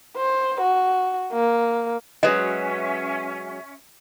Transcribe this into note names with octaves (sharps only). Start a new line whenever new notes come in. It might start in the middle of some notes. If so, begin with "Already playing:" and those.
C5
F#4
A#3
F#3 G#3 C#4 F#4 B4 D#5 E5 G#5